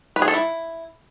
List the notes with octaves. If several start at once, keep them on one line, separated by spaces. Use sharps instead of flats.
B4
G#4
A4
E4